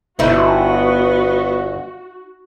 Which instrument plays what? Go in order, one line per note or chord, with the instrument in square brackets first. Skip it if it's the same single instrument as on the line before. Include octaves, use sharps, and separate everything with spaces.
[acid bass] G1 [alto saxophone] B3 [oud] D#4 E4 [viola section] F#4